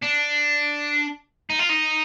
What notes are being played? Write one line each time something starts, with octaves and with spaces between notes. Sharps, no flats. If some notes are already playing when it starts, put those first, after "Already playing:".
D4
D#4
F4
D#4